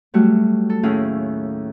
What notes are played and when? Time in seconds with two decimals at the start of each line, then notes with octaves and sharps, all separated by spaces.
0.14 F#3 G3 A3 F#4
0.70 A4
0.83 D#2 A2 C#4 E4 G#4 F5